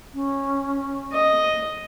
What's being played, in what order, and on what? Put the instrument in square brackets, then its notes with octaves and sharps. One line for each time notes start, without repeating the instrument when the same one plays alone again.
[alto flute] C#4
[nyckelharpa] D#5